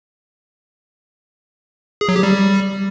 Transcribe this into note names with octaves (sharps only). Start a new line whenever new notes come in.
G#4
F#3
G4
G3